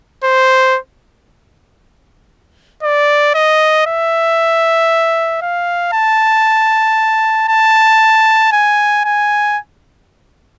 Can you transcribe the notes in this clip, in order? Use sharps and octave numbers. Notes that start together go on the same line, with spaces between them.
C5
D5
D#5
E5
F5
A5
A5
G#5
G#5